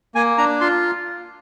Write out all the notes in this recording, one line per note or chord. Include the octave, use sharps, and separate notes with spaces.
A#3 G#5
D4 A#5
F4 C6